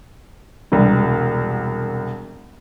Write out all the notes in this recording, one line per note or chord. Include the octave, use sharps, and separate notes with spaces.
E1 C2